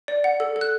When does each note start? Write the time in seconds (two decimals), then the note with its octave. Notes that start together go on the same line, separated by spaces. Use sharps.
0.08 D5
0.24 F#5
0.40 A4
0.56 A4
0.61 F#6